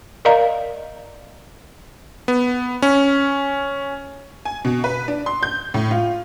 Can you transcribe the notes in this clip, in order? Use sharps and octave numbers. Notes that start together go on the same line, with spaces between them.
A#4 D5 D#5 F5 A#5
B3
C#4
G#5
B2
B4
D4
C6
G6
A2
F4